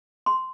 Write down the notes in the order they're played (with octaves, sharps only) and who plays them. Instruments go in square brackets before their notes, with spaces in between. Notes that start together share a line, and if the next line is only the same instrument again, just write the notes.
[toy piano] C6